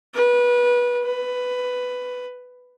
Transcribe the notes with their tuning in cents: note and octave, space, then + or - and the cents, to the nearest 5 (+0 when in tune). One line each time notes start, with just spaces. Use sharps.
B4 -25
B4 +10